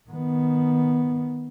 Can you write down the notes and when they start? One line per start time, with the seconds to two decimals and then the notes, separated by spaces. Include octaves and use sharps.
0.10 D#3 B3